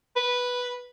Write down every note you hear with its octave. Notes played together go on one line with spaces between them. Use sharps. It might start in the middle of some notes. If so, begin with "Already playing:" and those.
B4